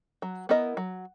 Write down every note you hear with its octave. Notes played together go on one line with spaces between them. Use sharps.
F#3
B3 E4 A#4 D#5
F#3